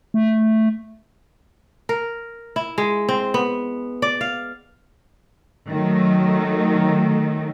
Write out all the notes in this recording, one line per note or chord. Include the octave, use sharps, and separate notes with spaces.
A3
A#4
E4
G#3
C4
B3
D5
F5
D#3 F#3 A3